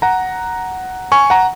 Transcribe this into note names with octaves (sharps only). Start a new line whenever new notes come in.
F#5 A#5
G#5 C#6
F#5 A#5